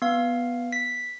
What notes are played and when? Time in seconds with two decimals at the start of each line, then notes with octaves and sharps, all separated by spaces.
0.02 B3 F5
0.72 B6